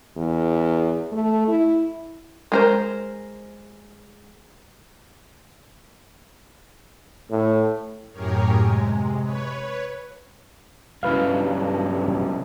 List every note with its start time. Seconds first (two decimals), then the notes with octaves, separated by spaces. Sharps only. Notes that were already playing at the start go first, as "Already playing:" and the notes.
0.17 E2
1.12 A3
1.48 E4
2.52 G#3 A#4 C5
7.31 A2
8.12 F#2 A2 G4 G#4 A#4 C#5
8.58 C3 G#3
9.21 B4 C#5
11.03 B1 G2 C#3 E4 B4 F5